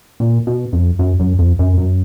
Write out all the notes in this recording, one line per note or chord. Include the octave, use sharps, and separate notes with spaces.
A#2
B2
F2
F#2
F#2
F2
F#2
F#2